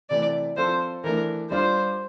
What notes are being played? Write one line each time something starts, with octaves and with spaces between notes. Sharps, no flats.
C3 E3 A3 D5
F3 C4 F4 A4 C5
E3 A3 D4 A#4
G3 D4 F4 C5